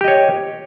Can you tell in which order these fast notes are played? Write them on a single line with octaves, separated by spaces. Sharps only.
G4 D#5 C#5